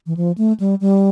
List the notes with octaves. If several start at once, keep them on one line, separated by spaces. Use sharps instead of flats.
E3
F3
A3
G3
G3